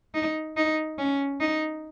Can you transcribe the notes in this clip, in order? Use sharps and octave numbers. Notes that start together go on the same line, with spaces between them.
D#4
D#4
C#4
D#4